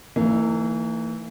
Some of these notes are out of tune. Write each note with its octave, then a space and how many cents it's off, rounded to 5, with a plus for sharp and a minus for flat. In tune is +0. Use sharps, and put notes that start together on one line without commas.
E3 +0 A#3 -45 D#4 +5